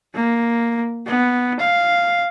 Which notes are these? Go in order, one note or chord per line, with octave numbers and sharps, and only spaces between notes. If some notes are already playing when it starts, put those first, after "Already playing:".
A#3
B3
F5